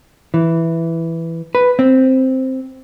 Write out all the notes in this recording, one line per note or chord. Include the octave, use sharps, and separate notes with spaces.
E3
B4
C4